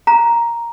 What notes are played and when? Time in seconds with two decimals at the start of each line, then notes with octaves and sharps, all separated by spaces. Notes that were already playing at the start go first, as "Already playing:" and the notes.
0.07 A#5